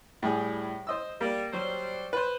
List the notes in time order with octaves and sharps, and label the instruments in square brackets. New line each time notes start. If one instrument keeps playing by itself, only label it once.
[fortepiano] A2 G3 G#4
C5 D#5 E6
[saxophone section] G3 [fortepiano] A#3
[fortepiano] F#3 [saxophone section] G3 C5
[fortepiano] B4 C5